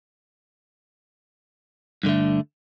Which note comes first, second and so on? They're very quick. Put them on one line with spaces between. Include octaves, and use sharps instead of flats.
G2 D3 A3